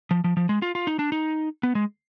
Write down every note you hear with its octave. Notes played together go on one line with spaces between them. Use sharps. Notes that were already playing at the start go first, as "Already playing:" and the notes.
F3
F3
F3
G#3
F4
F4
D#4
D4
D#4
B3
G#3